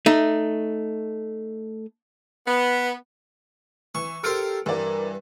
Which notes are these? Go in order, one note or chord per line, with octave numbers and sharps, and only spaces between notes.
A3 D#4
B3
E3 C#6
G4 A4 A#4 C5 F6 C#7 D7
G2 E3 A#4 D5